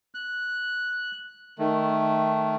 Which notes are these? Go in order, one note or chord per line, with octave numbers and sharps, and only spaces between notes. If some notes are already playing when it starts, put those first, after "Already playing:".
F#6
D#3 A3